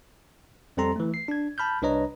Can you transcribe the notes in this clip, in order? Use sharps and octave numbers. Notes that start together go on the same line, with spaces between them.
F2 G3 C4 A4 A#5 C6
E3 A3
C7
D4 G#6
A5 B5 F6 G6
C2 D4 B4 C#5 D#5 A#5